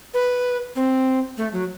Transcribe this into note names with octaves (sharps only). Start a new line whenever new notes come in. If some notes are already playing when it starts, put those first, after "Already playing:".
B4
C4
A3
F#3